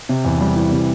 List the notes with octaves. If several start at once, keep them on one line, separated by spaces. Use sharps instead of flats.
C3
E2
G3
E3
C3